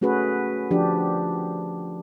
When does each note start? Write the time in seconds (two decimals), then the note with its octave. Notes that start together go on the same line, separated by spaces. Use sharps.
0.01 A3 C#4 F#4 G#4 B4
0.71 F3 D4 G4